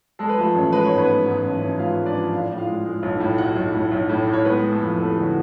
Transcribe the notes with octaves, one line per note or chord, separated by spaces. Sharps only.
G#3 A4
B4
F3 A3 A4
A1
G#3 B4
G#2 C#5
B3 B4
G#3
G#2
A1
A1
G#3 F4 F5
G#3
D4 D5
F3
A2 F5
D5
A2
F4 F5
G#3
G#3
B1
A2
B1 F#4 F#5
B1
A2
B1
A2
A2
C#5
G#3 B3 B4
G#3
A3 A4
F2
B3 A4
D3 G#4
F#4